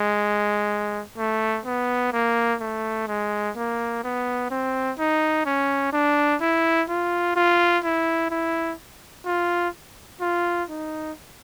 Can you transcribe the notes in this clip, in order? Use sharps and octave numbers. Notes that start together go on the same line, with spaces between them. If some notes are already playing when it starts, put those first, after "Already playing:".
Already playing: G#3
A3
B3
A#3
A3
G#3
A#3
B3
C4
D#4
C#4
D4
E4
F4
F4
E4
E4
F4
F4
D#4